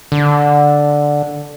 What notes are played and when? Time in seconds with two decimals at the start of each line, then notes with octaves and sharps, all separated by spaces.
0.12 D3